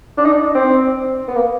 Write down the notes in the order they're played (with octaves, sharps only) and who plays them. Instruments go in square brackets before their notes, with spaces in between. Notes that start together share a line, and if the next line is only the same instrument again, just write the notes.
[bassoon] D4
D#4
D4
C4
B3
A#3